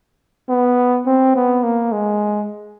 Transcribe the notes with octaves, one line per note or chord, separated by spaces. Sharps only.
B3
C4
B3
A#3
G#3